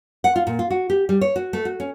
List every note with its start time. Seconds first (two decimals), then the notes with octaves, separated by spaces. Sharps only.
0.24 F#5
0.36 F4
0.47 A#2
0.59 F4
0.70 F#4
0.90 G4
1.09 G3
1.21 C#5
1.36 F#4
1.53 A3
1.65 F#4
1.80 C#4